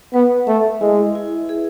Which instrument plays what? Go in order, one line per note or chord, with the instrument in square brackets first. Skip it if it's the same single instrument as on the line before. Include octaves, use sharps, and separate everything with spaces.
[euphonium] B3 [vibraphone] B4
[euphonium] A3 [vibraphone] E5
[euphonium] G#3 [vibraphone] E4
[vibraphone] E4
G#4